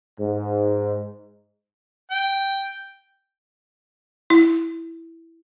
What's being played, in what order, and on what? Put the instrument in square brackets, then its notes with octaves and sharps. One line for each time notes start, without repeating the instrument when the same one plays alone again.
[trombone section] G#2
[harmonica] G5
[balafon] E4